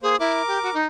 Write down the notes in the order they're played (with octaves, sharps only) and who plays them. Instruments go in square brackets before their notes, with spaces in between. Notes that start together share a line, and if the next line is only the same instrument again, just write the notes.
[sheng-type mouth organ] A#3 C5 [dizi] G#4
[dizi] E4 [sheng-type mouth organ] A#4 D6
[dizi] G4
F#4
D#4